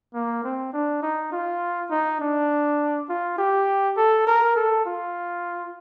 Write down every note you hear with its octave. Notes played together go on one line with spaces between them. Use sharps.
A#3
C4
D4
D#4
F4
D#4
D4
F4
G4
A4
A#4
A4
F4